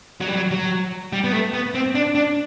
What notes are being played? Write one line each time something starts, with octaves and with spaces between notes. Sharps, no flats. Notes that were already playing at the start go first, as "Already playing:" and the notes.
F#3
G3
F#3
F#3
G3
B3
A3
B3
C4
D4
D4